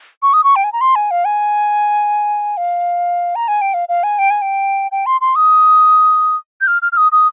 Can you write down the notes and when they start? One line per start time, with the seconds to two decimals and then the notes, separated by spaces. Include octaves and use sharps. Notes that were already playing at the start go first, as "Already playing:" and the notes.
0.23 C#6
0.33 D#6
0.44 C#6
0.56 G5
0.64 G#5
0.73 A#5
0.81 C6
0.96 G#5
1.11 F5
1.25 G#5
2.57 F5
3.36 A#5
3.48 G#5
3.61 G5
3.74 F5
3.89 F5
4.03 G#5
4.19 G5
4.30 G#5
4.42 G5
4.92 G5
5.06 C6
5.21 C6
5.36 D#6
6.61 G6
6.67 F6
6.82 F6
6.92 F6
6.97 D#6
7.12 D#6